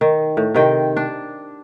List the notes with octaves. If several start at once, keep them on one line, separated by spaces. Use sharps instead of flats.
D#3
A2
C3 D#3 G5
D4